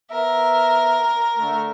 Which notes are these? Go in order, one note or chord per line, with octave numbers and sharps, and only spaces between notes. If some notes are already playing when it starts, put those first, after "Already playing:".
B3 A#4 E5
D3 A3